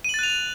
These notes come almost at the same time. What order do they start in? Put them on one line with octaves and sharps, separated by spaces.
D#7 F#7 A6 F#6 F7